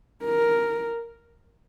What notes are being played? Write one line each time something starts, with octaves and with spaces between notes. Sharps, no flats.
A#4